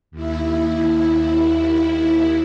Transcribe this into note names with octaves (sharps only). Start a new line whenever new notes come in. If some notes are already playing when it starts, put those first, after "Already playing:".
D#2 E4